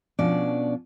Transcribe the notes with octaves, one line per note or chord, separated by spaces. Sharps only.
B2 F3 C#4 D4 D5